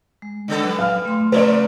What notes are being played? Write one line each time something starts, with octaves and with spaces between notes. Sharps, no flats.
G#3
C#3 B3 A4
F#3 G3 B4
F5 F6
A3 C6
C3 F3 A#3 B4 D5